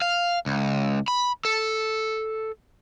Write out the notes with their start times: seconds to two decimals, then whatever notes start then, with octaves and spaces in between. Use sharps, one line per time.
0.02 F5
0.46 C#2
1.08 B5
1.45 A4